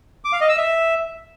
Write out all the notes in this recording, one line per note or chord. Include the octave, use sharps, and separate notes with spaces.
D6
F5
D#5
E6
E5